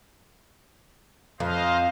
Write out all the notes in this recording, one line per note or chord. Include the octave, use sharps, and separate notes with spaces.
F2 C5 D#5 F5